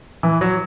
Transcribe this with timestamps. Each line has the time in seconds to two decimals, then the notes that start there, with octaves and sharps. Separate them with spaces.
0.23 E3
0.41 F#3